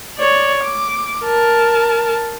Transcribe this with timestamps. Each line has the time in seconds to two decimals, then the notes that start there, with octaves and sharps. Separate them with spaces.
0.18 C#5 D5
0.63 D6
1.24 A#4 A5